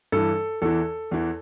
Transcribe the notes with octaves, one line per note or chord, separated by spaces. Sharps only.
G2 E3 A4
E2 E3 A4
E2 E3